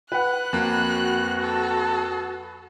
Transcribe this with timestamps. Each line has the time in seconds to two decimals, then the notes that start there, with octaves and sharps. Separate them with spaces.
0.12 B4 F#5 F#6
0.53 F2 A#3 F#4
1.40 A4